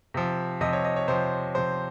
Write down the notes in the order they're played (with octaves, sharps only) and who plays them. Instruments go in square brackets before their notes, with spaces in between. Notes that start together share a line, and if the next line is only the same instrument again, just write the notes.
[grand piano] C3 F3
C3 F3 D#5
C#5
D#5
C#5
C3 F3 C5
C3 F3 C5